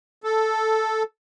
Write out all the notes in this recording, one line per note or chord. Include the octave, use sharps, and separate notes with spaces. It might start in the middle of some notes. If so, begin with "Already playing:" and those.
A4